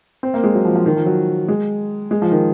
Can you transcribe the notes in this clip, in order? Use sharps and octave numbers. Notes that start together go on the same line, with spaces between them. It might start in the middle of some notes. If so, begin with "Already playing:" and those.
C4
A#3
G#3
F#3
F3
F3
D#3
F3
F#3
G#3
G#3
F3
D#3